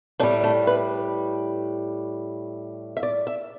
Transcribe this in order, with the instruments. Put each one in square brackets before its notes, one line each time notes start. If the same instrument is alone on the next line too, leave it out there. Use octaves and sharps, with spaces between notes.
[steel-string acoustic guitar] A2 D4
G3
A3
B4
E5
D5
E5